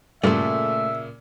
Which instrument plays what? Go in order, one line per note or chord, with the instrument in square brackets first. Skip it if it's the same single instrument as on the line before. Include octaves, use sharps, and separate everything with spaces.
[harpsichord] G2 [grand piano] A#2 C#3 [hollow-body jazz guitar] A3 A4 [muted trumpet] E5